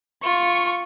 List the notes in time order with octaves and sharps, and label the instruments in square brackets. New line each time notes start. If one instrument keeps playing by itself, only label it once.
[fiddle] F4 [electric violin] C#6